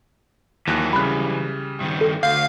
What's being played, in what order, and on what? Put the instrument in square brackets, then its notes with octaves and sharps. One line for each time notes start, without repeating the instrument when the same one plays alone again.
[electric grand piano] D#2 F#6 [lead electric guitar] E3 F#3
[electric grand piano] C#3 G3 [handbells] B5 F#6
[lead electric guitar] G2 D#3
[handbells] A4
[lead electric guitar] D2 [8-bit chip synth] F5 [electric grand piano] G6